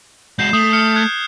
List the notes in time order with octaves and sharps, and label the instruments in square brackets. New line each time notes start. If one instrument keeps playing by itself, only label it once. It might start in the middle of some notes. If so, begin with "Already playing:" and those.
[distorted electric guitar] G#3 F#4 [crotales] G6 C7 E7
[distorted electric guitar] A3 [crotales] D#6
[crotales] F6 C#7
F#6 G#6